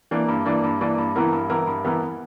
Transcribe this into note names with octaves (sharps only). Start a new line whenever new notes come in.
E3 A#3 D4
G2
E3 A#3 D4
G2
E3 A#3 D4
G2
E3 B3 E4 A#4
G2
E3 B3 E4 A#4
G2
E3 B3 E4 A#4